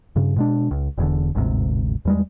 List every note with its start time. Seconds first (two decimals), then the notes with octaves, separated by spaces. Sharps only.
0.16 G2 C#3
0.36 B2 G#3 D4
0.71 C#2
0.98 E1 E2 D3
1.35 G1 D2 G#2 C3
2.05 E2 G3 G#3